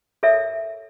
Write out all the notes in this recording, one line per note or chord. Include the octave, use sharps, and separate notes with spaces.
A4 A#4 C#5 E5